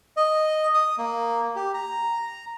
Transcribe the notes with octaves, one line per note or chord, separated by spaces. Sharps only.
D#5
D#6
A#3
G4
A#5